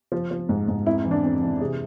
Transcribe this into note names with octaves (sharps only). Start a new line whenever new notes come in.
F3
F3
G#2
G#2
F2 E4
E3
D4
F2
E3
C3 G#4